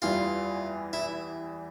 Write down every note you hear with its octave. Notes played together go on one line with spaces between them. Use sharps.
E2 E3 G3 F4
E4